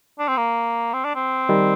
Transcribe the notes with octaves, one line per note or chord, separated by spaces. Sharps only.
D4
C4
A#3
C4
D4
C4
D#3 G3